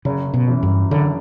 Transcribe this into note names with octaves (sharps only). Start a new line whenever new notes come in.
F#1 C#3
B2
F#2 E3
G2
F#1 D3